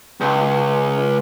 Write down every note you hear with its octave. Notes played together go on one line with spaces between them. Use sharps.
C#2